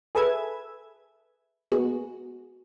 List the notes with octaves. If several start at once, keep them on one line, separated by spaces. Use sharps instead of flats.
G#4 A4 B4 E5 G#6
A#2 G#3 B3 F#4 G#4